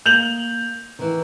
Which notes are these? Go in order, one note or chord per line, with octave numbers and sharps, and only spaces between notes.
A#3 G6 F7 F#7
D#3 E3